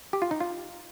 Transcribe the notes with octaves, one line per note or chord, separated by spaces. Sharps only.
G4
F4
D#4
F4